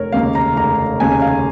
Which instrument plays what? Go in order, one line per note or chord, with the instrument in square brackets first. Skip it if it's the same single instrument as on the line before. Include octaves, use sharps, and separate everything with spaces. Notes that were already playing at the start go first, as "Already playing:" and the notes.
Already playing: [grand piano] F1 A#4 C#5
D#2 C#3 A#3 F5
A#5
F1 A#5
D#2 C#3 A#3 G#5
F5